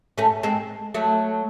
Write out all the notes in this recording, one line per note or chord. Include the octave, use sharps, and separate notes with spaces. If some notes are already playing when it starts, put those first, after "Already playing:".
A3 C#4
G#3 C4
F#3 A3